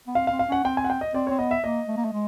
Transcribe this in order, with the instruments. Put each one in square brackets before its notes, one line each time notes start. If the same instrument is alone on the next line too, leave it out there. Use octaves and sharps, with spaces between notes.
[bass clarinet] B3
[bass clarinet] C4 [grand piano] F5
[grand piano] F5
[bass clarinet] C4
[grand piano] F5
[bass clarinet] C#4 [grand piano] F#5
[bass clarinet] C4 [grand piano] G5
[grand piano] G#5
F#5
G5
D#5
[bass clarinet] C4 [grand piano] D5
[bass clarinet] C4 [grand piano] C#5
[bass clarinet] B3 [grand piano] D#5
[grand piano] E5
[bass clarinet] A#3 [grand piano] D#5
[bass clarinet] A3
A#3
A3
G#3